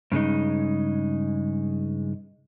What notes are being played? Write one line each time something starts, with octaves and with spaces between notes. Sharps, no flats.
G2 C#3 G#3 D#4